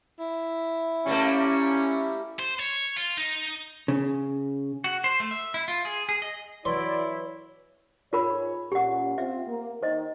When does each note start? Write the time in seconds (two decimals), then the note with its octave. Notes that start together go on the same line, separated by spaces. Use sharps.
0.20 E4
1.06 G3 A3 A#3 C#4
2.39 C5
2.60 C#5
2.97 F4
3.17 D#4
3.88 C#3
4.84 F#4
5.04 C5
5.20 A3
5.31 E5
5.54 E4
5.68 F4
5.85 G#4
6.09 G#4
6.22 D#5
6.65 E3 F#3 E4 B4 C#5 D5 C6
8.13 G#2 F4 A#4 C#5 B5
8.72 A#2 C#4 G4 F#5
9.18 C4 F4 E5
9.48 A#3
9.83 D#3 C5 D#5